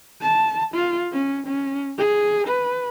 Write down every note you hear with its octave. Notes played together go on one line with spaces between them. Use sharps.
A5
F4
C#4
C#4
G#4
B4